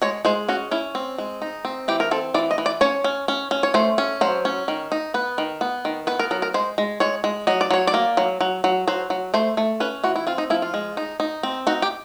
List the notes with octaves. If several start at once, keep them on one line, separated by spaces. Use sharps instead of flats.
G#3 C#5
G#3 C5
C#4 F#4
C#4 E4
C4
G#3
D#4
C4
E3 G4
A#4
C4 A4
E3 D5
D#5
E3
D5
C#4 C#5
C#4
C#4
C#4
C#5
A3 C5
C#4
F#3 C5
C#4
D#3
D#4
B3 B4
D#3
B3
D#3
B3 B4
A#4
F#3 A#4
A#4
G#3 C5
G#3
G#3 C#5
G#3
F#3 D#5
D5
F#3 C#5
D5
A#3
F#3
F#3
F#3
F#3 C5
F#3
A3 C5
A3
C#4 B4
E3 F#4
E4
C4 F4
D#4
F3 E4
F4
G#3
D#4
D#4
C4
D#4 F#4
G4